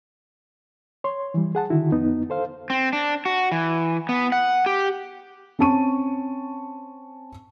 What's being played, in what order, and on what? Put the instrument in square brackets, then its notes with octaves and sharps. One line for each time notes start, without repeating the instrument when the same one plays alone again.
[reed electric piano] C#5 C6
E3 G3
G#4 F#5 A5
D3 D#3 E4 F#4
F2 B3 D#4
A4 C5 F5
[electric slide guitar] C4
D4
F#4
E3
B3
F#5
G4
[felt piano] C4 C#4 A5 C#6 D#7